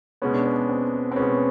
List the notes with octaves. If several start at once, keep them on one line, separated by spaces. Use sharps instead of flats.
B2 G#3 B3 C#4
D4
C#4
C4
C4
B2 G#3 B3 C#4